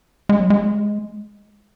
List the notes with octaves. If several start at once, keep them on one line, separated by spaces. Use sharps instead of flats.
G#3
F#3
G#3